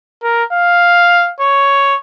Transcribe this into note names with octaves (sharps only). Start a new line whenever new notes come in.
A#4
F5
C#5